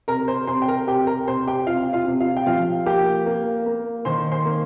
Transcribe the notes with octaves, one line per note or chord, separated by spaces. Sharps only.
C3 A#4 A#5
C5 C6
C3 C5 C6
G5
A#4 A#5
C3 G4 G5
A#4 A#5
C3 C5 C6
G4 G5
C3 F4 F5
F4 F5
C3
F4 F5
G5
F3 F4 F5
A#3 G4 G5
A#3
A#3
D#3 C5 C6
C5 C6
A#3